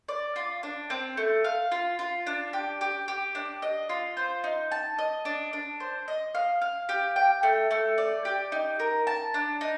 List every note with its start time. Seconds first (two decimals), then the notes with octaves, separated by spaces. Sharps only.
0.09 D5
0.36 F4
0.63 D4
0.90 C4
1.17 A3
1.44 F5
1.72 F4
1.99 F4
2.27 D4
2.53 G4
2.81 G4
3.08 G4
3.35 D4
3.62 D#5
3.89 F4
4.17 C5
4.44 D#4
4.72 A5
4.99 D#5
5.25 D4
5.53 D4
5.80 C5
6.08 D#5
6.35 F5
6.62 F5
6.89 G4
7.16 G5
7.43 A3
7.71 A3
7.98 D5
8.25 G4
8.52 D#4
8.80 A#4
9.07 A5
9.34 D4
9.61 D#4